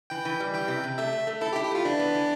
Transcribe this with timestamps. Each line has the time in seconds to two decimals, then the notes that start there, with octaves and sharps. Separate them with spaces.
0.10 E3 G5
0.25 E3
0.40 G3
0.54 E3 G5
0.68 C3
0.83 C3
0.98 A3 E5
1.13 A3
1.27 A3
1.41 E4 A4
1.53 G4
1.56 E4
1.64 G4
1.71 A3 F4
1.85 E3 D4
1.99 B3
2.15 E3